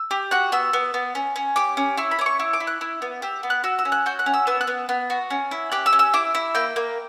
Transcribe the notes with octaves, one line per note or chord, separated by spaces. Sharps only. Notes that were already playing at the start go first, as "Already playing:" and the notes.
Already playing: E6
G4
F#4 F#6
B3 E6
B3
B3
C#4
C#4
G4 D6
C#4
E4 C#6
B5
C#4 D6
C#6
E4
D6
E4
F#6
E4
B3
G4 E6
B3
F#6
F#4 E6
E6
C#4
F#6
F#4 G6
F#6
C#4
E6
B3 E6
F#6
B3
B3
F#4
C#4
E4
G4 F#6
E6
C#4
E6
E4 D6
E4
A#3 G5
A#3